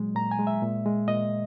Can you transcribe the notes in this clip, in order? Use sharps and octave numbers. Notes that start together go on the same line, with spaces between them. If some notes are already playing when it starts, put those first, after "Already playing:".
Already playing: A#2 F#3 G#3
A#2 A#5
G#5
G#3
E5
A#2
G#3
A#2 D#5